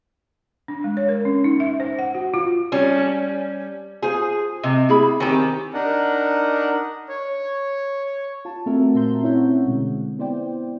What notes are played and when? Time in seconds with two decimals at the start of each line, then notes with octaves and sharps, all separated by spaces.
0.68 D4
0.84 G#3
0.97 C#5
1.09 A#4
1.25 C#4
1.44 D#4
1.60 E5
1.80 C5
1.99 F#5
2.15 F#4
2.34 F4
2.72 G3 C#4
2.95 C#5 D5 A5
4.02 F4 G#4 C5
4.63 C3 D#5
4.89 E4 G#4 B5
5.20 D#3 C4 G4 G#5
5.74 D4 D#4 A#4 F#5
7.09 C#5
8.45 F4 A5
8.66 A3 C4 F4 F#4 A#4 E5
8.94 A#2 E5 A5 A#5 C6 G6
9.22 C4 C#4 E4 C#5 E5 F#5
9.66 B2 D3 G#3
10.19 B3 E4 C5 D5 G5